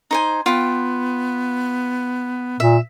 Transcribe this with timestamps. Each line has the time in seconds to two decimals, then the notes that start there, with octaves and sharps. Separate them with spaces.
0.11 D#4 C5 G#5
0.46 B3 F4 G5
2.60 A#2 E5